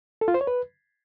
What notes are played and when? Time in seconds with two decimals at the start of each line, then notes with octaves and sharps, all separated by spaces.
0.21 A4
0.28 F4
0.34 C5
0.41 C#5
0.47 B4